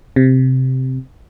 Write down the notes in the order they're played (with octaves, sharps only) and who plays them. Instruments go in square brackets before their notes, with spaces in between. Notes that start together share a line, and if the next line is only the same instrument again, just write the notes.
[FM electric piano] C3